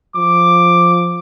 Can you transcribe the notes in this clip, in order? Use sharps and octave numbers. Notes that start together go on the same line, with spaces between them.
F3 D6